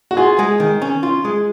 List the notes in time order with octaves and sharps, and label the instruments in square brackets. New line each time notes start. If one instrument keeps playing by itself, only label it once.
[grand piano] F#4
[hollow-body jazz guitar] F4 [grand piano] G#4
[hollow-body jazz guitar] G#3
D#3
C#4
F4
G#3